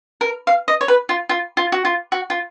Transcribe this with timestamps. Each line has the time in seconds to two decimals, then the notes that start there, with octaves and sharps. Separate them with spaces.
0.21 A#4
0.47 F5
0.68 D#5
0.81 C#5
0.88 B4
1.09 F4
1.29 F4
1.57 F4
1.72 F#4
1.85 F4
2.12 F#4
2.30 F4